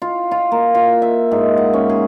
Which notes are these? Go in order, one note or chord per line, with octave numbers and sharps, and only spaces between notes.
F4
F4
A#3
F4
E5
G#2
F#5
C#4
G#4